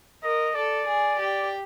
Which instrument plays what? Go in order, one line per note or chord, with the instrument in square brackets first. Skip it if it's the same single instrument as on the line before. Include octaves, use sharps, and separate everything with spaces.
[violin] A#4 [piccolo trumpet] D#5
[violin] A4 [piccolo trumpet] D5
[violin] G#4
G4